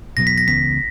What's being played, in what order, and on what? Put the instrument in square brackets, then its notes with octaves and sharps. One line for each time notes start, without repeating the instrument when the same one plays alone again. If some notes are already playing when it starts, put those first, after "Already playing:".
[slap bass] E2 B2 F#3 B3 [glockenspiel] A#6
[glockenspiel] B6
A#6
[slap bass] C#2 C#3 E3 B3 [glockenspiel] B6